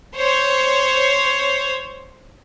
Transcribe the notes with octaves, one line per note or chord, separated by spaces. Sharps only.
C5 C#5